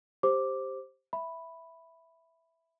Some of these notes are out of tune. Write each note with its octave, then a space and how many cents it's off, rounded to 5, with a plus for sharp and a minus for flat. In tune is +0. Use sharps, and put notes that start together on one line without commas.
G4 +0 C5 +10 D6 +0
E5 +0 B5 +0